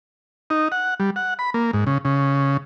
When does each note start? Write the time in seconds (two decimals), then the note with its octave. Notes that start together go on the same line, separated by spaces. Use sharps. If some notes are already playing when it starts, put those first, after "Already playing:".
0.50 D#4
0.72 F#5
1.00 G3
1.16 F#5
1.39 B5
1.54 A#3
1.73 G#2
1.87 C#3
2.05 C#3